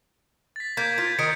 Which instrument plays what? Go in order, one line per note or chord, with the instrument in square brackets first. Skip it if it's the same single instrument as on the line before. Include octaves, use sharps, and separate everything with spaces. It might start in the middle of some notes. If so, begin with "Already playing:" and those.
[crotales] A6 B6
[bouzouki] A#3 [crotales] G6 G#6 B6
[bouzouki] F4
[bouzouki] D#3 A#4 D#5 [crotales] C#7